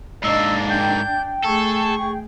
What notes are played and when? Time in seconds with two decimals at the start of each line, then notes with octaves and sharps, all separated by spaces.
0.23 G#2 A#3 D4 D#5 E6
0.69 G5 G6
1.44 A3 G#4 A4 C#6